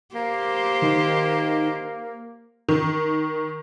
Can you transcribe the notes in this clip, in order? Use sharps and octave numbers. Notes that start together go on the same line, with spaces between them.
A#3 G4 C5
D#3
D#3